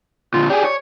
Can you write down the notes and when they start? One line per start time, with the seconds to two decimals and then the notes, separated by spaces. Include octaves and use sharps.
0.34 A#2 D3 F4
0.50 G4 G#4 D5
0.65 C#5